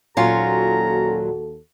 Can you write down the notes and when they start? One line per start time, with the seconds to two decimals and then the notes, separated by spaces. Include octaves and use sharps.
0.17 D#2 A#2 F#3 C#4 F4 F#4 A4 A#5